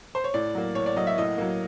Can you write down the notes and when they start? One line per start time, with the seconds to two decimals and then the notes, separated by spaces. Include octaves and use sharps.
0.15 C5
0.24 C#5
0.34 A2 D5
0.55 F#3 A#3
0.75 A2 C#5
0.86 D5
0.96 F#3 A#3 D#5
1.07 E5
1.18 A2 D#5
1.38 F#3 A#3